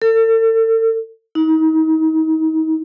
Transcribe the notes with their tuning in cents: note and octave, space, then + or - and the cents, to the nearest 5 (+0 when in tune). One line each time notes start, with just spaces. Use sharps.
A4 +40
D#4 +35